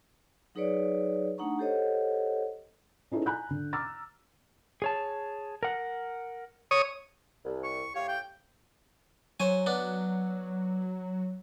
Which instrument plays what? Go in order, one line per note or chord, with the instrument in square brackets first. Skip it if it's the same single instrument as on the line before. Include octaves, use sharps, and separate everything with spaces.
[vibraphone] F#3 D#4 G#4 B4 C#5 D5
A3 D4 D#4 F#5 A#5 C#6
G4 A4 C5 C#5 D#5 F#5
[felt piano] C#4 D#4 E4 G#4 A4 B4
G#5 A#5 B5 F#6 G6
D3
A#5 D6 E6 F6 A6
[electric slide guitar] G#4 C#5 A5
A#4 F#5
[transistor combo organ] C#5 D#6
[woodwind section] C2
[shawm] C#6
[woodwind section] A2 G4 F5 [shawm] C#5
[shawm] G5
[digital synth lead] F#3 [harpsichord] C5 C#5 G#5
[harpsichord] B3 D4